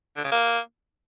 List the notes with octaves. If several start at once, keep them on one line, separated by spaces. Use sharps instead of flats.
D3
C#3
A#3